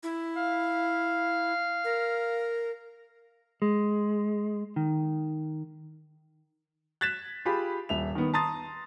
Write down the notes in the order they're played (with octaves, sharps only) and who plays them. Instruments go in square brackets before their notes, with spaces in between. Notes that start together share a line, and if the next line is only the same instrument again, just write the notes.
[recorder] E4
[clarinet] F5
[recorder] A#4
[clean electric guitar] G#3
D#3
[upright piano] F#6 G#6 A6 B6 E7
F4 G4 G#4 B5
D#1 E5 F7
D#3 B3
A5 A#5 C6 D#6 A6